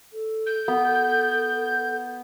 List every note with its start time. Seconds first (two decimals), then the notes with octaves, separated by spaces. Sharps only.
0.13 A4
0.46 G6
0.68 B3